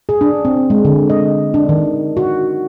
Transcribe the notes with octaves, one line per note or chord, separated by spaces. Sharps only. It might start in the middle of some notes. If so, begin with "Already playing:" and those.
G#4
D4
C4
G#3
D3
D#5
D4
D#3
F#4